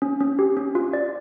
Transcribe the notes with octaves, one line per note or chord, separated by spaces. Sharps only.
C#4
C#4
G4
C#4
F4
D5